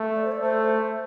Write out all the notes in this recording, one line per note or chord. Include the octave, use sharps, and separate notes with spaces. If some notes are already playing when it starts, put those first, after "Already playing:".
Already playing: A3
D5
C5
D5
A3 C5